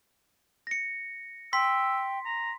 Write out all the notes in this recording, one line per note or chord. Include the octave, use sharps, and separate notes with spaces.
A#6 C#7
G5 C6 E6 B6
A#5